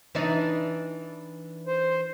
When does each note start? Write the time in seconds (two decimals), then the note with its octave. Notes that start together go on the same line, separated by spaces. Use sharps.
0.15 E3 D4 D#4
1.67 C5